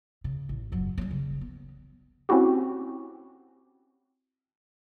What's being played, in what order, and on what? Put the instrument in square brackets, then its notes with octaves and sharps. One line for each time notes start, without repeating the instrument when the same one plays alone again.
[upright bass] C#3
A1
F#1 F#3
G3 C#4
C#3
B3
[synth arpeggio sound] C4 C#4 E4 F#4 G4